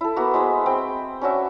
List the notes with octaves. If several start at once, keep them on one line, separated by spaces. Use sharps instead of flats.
E4 A4
A#3 B3 E4 F#4
G#3 C5 B5
C4 G5
C#4 D4 F#4 E5